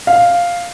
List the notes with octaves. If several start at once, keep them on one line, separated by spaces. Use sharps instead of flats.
F5